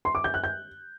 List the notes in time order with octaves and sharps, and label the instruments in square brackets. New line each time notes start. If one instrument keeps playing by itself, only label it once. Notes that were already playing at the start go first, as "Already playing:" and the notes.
[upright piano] C6
D6
G6
F#6
G6